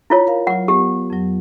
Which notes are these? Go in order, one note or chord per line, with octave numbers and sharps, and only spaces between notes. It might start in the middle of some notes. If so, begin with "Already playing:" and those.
E4 F4 C#5
A#4 F5
F#3 F4 F#5
B3 G4
F2 F#3